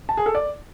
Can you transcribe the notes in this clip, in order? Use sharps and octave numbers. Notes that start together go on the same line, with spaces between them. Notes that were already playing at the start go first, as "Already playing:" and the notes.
A5
G#4
A4
D5